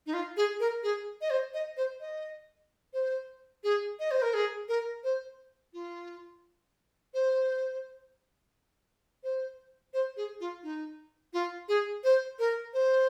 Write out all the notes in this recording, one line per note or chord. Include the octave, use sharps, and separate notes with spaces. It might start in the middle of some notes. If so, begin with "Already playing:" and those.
D#4
F4
G#4
A#4
G#4
D#5
C5
D#5
C5
D#5
C5
G#4
D#5
C5
A#4
G#4
A#4
C5
F4
C5
C5
C5
G#4
F4
D#4
F4
G#4
C5
A#4
C5